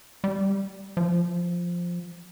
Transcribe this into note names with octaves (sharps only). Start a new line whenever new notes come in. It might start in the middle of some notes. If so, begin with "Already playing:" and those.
G3
F3